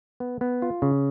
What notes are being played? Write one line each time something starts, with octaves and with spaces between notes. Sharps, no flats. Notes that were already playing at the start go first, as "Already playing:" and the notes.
B3
B3
F4
C#3